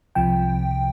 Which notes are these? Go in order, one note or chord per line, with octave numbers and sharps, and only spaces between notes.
C2 C3 F3 G5